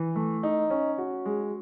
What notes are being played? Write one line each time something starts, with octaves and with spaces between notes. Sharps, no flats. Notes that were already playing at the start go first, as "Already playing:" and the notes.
Already playing: E3
A3
D#4
C#4
F#4
G#3